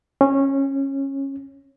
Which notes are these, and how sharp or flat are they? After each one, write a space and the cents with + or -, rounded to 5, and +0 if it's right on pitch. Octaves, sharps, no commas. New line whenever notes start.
C#4 -20